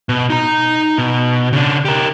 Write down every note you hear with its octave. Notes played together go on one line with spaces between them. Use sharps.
B2
D#4 A#5
B2
C#3 D4
G4 A#4